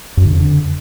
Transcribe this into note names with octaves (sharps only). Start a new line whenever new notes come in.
F#2
D3
F2
D3